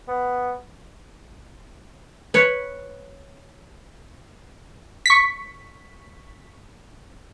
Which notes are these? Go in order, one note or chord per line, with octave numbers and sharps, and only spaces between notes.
B3
B4 C#5
C#6 B6